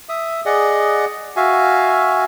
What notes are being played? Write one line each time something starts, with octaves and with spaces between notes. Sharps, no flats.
E5 D#6
G#4 D5 D#5 F#5
F#4 E5 F5 G#5